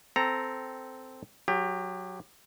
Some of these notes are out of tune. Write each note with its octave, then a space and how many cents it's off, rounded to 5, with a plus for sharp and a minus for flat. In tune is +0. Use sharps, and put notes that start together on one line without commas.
C4 -10 A4 +0 A#5 +0
F#3 +0 G4 +25